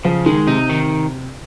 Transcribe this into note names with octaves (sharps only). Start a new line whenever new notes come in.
C#3 F3
D#3 G#3
C3 D#4
D#3